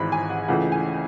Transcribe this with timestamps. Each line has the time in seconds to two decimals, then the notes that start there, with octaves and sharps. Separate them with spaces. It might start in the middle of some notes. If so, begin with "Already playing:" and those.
Already playing: G#1 G#2 E3 B5
0.12 G#5
0.30 F#5
0.48 C#2 C#3 E3 A3 F#5
0.72 G#5